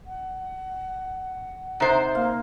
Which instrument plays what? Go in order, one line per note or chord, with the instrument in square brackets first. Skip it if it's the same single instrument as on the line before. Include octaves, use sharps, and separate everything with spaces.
[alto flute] F#5
[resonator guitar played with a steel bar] C3 C5 [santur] D#4
[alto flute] A#3 [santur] F5